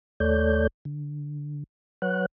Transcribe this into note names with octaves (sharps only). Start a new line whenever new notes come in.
D#2 A3 A4 C#5 D5 G6
D3
F#3 B4 C#5 F#5 F#6